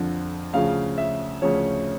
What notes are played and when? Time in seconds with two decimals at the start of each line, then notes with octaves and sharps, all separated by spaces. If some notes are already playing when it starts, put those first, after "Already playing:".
Already playing: F2 D3 F3
0.53 D2 C#3 F3 F5
0.98 E5
1.42 D2 C#3 F3 C#5